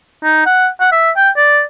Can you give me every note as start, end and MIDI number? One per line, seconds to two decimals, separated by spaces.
0.24 0.43 63
0.46 0.68 78
0.80 0.91 78
0.92 1.10 76
1.16 1.29 79
1.37 1.62 74